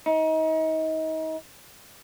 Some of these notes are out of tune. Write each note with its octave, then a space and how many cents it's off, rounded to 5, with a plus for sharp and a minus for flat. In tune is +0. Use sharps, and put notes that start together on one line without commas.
D#4 +30